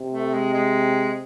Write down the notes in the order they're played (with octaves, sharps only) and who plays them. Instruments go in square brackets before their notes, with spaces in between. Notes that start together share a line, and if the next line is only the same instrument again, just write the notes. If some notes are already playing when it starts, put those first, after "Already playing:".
Already playing: [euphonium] C3
[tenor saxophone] A3
G#3
G#3